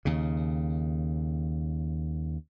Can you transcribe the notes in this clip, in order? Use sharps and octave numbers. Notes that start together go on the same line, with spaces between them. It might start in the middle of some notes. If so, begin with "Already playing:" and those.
D#2 C#3